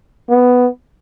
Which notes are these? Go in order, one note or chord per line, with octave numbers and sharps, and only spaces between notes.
B3